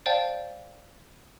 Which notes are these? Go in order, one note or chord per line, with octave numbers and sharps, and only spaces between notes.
C5 D5 F5 G5 A5